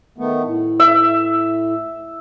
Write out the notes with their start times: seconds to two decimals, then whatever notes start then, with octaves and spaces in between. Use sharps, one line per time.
0.18 D#3 A3 B3
0.44 A2
0.80 E5